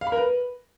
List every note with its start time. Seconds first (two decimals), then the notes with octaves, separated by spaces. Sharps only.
0.01 F5
0.07 B5
0.12 A#4
0.18 B4